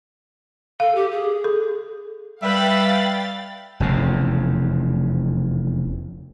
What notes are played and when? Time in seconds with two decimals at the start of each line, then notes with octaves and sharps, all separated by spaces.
0.80 A4 F5
0.95 G4
1.11 G#4
1.44 A4
2.43 G3 B4 E5 F5 G5 B5 A6
3.80 F1 E2 C#3